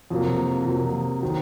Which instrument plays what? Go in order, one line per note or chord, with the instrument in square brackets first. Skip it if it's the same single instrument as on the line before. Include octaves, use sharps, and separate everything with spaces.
[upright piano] F2 C3 F#3 A#3
F2 C3 F#3 A#3
D#3 F#3 C4